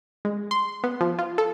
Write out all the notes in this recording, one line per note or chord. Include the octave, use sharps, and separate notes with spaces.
G#3
C6
B3
F3
F4
A4